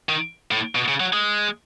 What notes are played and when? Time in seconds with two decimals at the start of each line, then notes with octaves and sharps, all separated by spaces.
0.09 D#3
0.51 A2
0.75 B2
0.88 C#3
1.00 F#3
1.13 G#3